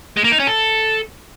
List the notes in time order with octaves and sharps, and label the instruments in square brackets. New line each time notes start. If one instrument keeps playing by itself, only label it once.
[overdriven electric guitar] G#3
A#3
D#4
C#4
A4